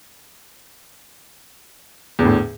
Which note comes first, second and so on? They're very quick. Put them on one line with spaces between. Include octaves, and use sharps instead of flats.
E2 D3 A2